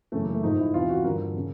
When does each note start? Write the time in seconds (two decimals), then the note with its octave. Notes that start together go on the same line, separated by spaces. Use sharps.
0.12 F#2 C#3 E3 A3
0.23 A#3
0.33 A3
0.43 G#2 F3 D#4
0.58 E4
0.74 E2 C3 E3 F4
0.89 F#4
1.04 G2 D3 F3 A#4
1.37 C#3